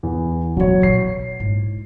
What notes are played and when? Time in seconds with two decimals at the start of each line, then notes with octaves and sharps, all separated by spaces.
0.03 E2
0.57 B2 E3 F#3 C#5
0.83 B2 C7
1.40 G#2 E4